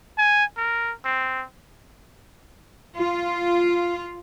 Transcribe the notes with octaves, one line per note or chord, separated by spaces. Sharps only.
G#5
A#4
C4
F4